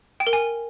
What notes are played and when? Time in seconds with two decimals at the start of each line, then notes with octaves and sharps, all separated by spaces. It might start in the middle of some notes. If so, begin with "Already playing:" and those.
0.20 G5
0.27 A#4
0.33 G#5